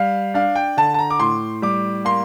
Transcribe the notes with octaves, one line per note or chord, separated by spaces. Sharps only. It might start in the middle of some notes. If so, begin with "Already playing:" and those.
Already playing: G3 F5
D4 F5
G5
D3 A5
A5
A#5
D6
A2 C6
G3 D6
A#3 C6